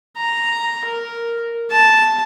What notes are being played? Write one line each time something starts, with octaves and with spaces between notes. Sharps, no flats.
A#5
A#4
A5